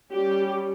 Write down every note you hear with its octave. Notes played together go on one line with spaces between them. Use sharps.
G3 C#4 G4